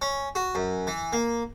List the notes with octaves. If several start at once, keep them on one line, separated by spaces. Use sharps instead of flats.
C#4
F#4
F#2
E3
A#3